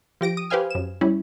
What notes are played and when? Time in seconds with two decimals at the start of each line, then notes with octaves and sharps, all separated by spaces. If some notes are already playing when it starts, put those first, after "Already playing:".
0.21 F3 G4 A#6 D7
0.37 D#6
0.50 G4 B4 C5 F5 G#5 F6
0.71 F#2 E7
1.01 G3 C#4 E4